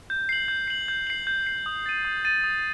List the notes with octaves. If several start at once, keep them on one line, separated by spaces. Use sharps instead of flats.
G6
C7 F#7
G6
C7 F#7
G6
C7 F#7
G6
C7 F#7
D#6
A6 D#7
D#6
A6 D#7
D#6